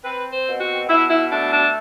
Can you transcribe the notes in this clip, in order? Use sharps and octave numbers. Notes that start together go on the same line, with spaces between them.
C4 B4
C5
B2
F#4
B2 E4
E4
A3 D4
D4